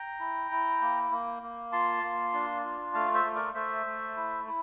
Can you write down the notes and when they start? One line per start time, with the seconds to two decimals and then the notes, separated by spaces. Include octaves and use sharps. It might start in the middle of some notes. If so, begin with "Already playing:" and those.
Already playing: G5 A#5
0.20 E4
0.51 E4
0.81 A#3
1.12 A#3
1.43 A#3
1.72 F4 A5 C6
2.03 A#3
2.34 D4
2.64 F4
2.94 A3 F5 A5
3.14 C5 E5
3.25 A3
3.35 A#4 D5
3.55 A3 C5 E5
3.86 A3
4.16 E4
4.47 E4